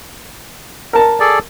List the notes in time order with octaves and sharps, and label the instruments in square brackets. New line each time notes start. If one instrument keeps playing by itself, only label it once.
[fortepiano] A#4 A5
[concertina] G#4 A4 D5